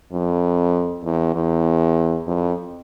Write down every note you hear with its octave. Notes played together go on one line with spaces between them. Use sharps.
F2
E2
E2
F2